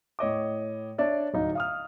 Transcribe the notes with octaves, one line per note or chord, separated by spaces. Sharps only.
A2 C#5 D#5 D6
D4 C#5 D5 E5
D1 D#4 F5
F5 D#6 F6